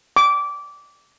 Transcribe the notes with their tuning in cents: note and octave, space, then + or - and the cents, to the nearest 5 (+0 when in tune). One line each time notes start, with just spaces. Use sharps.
D6 -20